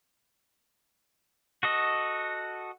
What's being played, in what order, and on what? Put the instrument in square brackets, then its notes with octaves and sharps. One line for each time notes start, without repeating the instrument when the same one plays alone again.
[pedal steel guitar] F#4 A4 D#5